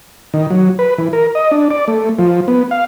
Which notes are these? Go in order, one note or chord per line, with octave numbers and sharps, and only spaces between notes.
D#3
F#3
B4
E3
A#4
D#5
D4
D5
A3
F3
B3
F5